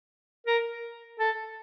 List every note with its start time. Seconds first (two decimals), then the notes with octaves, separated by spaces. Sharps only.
0.47 A#4
1.19 A4